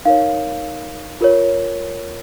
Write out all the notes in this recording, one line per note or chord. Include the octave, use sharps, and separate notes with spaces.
D#4 A#4 C#5 F5
F4 A#4 C#5